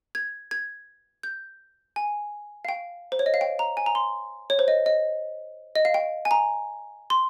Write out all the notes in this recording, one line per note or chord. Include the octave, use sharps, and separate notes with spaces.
G#6
G#6
G6
G#5
F5
G5
C5
C#5
D#5
F5
G5
A#5
G#5
A#5
C6
C#5
C5
D#5
D#5
D#5
F5
G5
G#5
A#5
C6